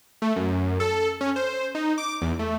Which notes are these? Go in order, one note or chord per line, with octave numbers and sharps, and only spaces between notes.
A3
F#2
A4
C#4
C5
D#4
D6
E2
A3